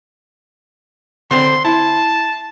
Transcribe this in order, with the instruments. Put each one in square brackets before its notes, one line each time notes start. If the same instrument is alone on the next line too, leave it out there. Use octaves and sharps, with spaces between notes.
[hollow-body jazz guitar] D3 C4 D4 [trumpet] C6
[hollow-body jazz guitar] E4 [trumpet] A5